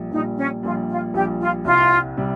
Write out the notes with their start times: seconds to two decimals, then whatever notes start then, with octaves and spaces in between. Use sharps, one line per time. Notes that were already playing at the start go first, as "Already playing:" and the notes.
Already playing: A#1 A#2 G3
0.11 A#1 D#4
0.14 A#2 G3
0.37 C#4
0.63 A#1 A#2 G3 F4
0.89 F4
1.14 A#1 A#2 G3 G4
1.40 F4
1.65 C2 C3 G3 F4
2.17 C3 G3